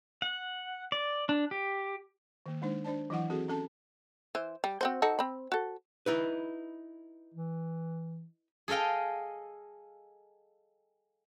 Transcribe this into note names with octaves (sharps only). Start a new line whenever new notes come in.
F#5
D5
D4
G4
D#3 A#3
G#3 D4 D#4 C5
D4 C5 D5 A5
E3 F#3 E4 F#5
C4 F#4 G#4 A4
C#4 A4 A5
E3 C5
G3
C4 F#4 C5
D#4 F#4 A4
C4 B5
F#4 A4
D#4 E4 B4
E3
G#4 A4 D#5 F5 G5